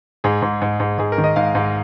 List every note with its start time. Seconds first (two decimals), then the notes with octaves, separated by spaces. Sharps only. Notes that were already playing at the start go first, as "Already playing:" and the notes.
0.24 G#2 G#4
0.42 G#2
0.62 G#2
0.80 G#2
0.98 G#2 G#4
1.12 A#4
1.18 D#3
1.24 D#5
1.36 G#2 F5
1.55 G#2